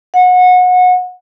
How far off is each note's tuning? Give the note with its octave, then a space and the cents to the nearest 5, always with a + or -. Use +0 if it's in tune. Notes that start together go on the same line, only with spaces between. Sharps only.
F#5 -25